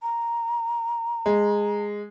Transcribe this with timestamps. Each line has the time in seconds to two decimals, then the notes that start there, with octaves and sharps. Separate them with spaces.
0.02 A#5
1.26 G#3